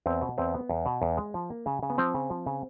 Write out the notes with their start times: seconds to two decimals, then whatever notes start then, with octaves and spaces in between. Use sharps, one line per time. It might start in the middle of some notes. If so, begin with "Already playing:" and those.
0.06 E2 C4
0.22 B2
0.38 E2 C4
0.54 B3
0.69 E2
0.86 B2
1.02 E2
1.17 G#3
1.34 F3
1.50 A#3
1.66 C#3
1.83 C#3
1.90 B3
1.98 F3 C4
2.14 C#3
2.30 F3
2.46 C#3